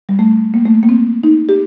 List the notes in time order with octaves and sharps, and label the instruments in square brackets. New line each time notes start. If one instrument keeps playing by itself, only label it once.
[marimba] G3
A3
A#3
A3
A#3
C4
D#4
G4